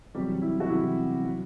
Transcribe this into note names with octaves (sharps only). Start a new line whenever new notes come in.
E2 C3 F#3 G3 G4
E4
F#4
E2 C3 F#3 E4
F#3